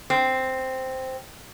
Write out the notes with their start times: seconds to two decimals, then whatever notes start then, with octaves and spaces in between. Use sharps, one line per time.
0.10 C4